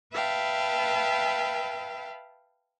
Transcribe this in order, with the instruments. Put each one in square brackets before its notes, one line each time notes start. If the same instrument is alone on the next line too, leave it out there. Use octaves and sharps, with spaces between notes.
[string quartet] B4 E5 F5 G5 A5